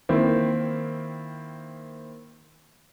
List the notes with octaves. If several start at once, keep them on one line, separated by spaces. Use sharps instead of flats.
D#3 A#3 C4 E4